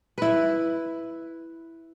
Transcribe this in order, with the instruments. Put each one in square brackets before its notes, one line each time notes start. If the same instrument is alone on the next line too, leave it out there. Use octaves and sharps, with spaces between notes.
[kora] E4 B4